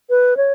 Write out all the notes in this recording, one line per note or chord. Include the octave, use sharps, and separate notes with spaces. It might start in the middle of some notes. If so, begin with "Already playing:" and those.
B4
C#5